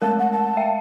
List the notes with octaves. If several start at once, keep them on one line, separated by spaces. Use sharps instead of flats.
G#3 A3 A#4 A5
F#5
A5
E5 F5 G5